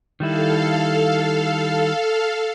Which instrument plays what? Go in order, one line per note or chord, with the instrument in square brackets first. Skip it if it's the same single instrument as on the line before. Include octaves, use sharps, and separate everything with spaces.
[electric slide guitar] D#3 G3 E4 [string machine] A4 F5